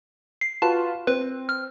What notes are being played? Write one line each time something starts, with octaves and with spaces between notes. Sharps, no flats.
C7
F4 F#4 B4 A5
C4 B4
F6